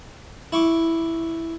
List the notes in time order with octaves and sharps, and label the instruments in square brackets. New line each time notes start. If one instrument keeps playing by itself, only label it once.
[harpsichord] E4 C#6 D6